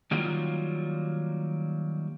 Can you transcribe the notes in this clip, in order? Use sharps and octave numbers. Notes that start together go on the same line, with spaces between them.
D#3 F#3 G3 A#3 F4